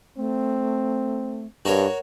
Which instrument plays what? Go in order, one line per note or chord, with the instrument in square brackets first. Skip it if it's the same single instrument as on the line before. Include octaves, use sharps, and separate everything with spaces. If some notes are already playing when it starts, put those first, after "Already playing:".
[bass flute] A3 [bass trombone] C4
[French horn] G2 [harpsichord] F#4 A#4 C#5